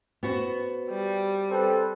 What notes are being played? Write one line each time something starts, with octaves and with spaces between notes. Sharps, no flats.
B3 F#4 C5
G3
C4 A4 B4